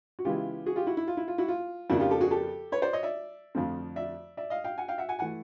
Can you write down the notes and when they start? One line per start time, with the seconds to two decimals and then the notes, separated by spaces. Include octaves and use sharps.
0.19 F#4
0.25 C#3 E3 G#3 B3 E4 F4 G4
0.66 F#4 G#4
0.76 F4 G4
0.87 E4 F#4
0.97 E4
1.08 F4
1.17 E4
1.28 F4
1.38 E4 F#4
1.48 F4
1.90 F2 C#3 F3 A#3 D4 E4 F#4
2.00 F4 G4
2.10 G4 A4
2.21 F#4 G#4
2.31 G4 A4
2.72 B4 C#5
2.82 C5 D5
2.93 C#5 D#5
3.03 D5 E5
3.55 F2 D3 F3 A3 C4
3.96 D5 E5
4.37 D5 E5
4.50 D#5 F5
4.64 F5 G5
4.78 F#5 G#5
4.88 F5 G5
4.98 E5 F#5
5.09 F#5 G#5
5.19 E3 A3 F#5 G#5